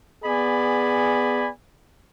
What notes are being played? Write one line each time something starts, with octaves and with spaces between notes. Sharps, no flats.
B3 G#4 D5 G#5 B5